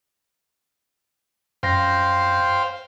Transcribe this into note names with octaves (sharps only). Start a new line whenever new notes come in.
F#2 C5 F5 G5 A#6